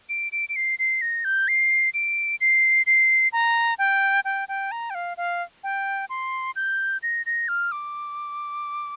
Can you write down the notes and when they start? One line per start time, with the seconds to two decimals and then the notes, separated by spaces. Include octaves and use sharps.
0.09 D7
0.32 D7
0.49 D7
0.56 C7
0.79 C7
1.01 A#6
1.25 G6
1.48 C7
1.94 D7
2.41 C7
2.87 C7
3.33 A#5
3.79 G5
4.25 G5
4.49 G5
4.72 A#5
4.90 G5
4.95 F5
5.17 F5
5.64 G5
6.10 C6
6.56 G6
7.03 A#6
7.26 A#6
7.48 F6
7.72 D6